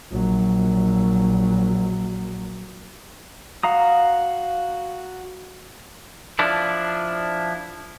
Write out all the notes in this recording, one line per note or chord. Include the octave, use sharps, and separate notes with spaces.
A#1 F#3
F#4 F5 A#5 D#6
F3 D4 E4